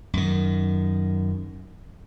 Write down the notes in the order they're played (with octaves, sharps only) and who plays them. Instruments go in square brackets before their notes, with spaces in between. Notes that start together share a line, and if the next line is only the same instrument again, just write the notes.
[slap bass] F#2 D#3